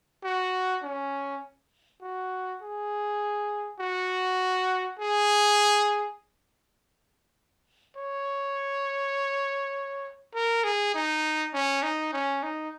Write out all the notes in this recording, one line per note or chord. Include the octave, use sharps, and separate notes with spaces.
F#4
C#4
F#4
G#4
F#4
G#4
C#5
A#4
G#4
D#4
C#4
D#4
C#4
D#4